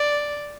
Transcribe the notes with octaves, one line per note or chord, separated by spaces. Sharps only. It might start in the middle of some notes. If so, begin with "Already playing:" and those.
Already playing: D5